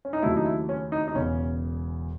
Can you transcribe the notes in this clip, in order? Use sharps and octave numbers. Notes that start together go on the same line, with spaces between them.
C#4
D#4
D#2 C#3 F#3 A3 E4
D#4
E4
C#4
D#4
D#4
E1 E2 C#3 C#4